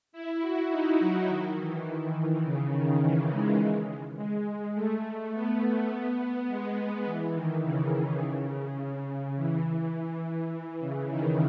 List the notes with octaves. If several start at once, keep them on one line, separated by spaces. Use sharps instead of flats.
E4
F#4
D#4
F#3
D#3
E3
E3
D#3
C#3
D#3
E3
G#3
G#3
A3
B3
A3
B3
B3
G#3
G#3
E3
D#3
C#3
C#3
E3
E3
C#3
D#3